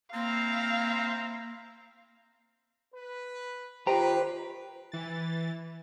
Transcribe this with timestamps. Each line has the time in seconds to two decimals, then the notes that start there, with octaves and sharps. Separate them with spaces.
0.14 A#3 C4 E4 C5 F5 A#5
2.94 B4
3.87 D#3 F4 G4 B4 C5 D#5 A#5
4.92 E3 A6